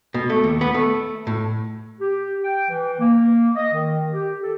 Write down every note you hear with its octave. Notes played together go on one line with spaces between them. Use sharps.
B2
A3
D#2
B3
A3
A2
G4
G5
E3
A#3
D#5
D#3
G4
A4